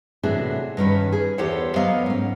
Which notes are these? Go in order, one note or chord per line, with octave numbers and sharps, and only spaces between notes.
A2 C3 E3 D4 F#4 G#4
G2 D#3 C#4 B4
G#4
E2 G4 A4 C5 C#5 F#5
F#3 B3 A#4 D#5 F5
G#2 C#4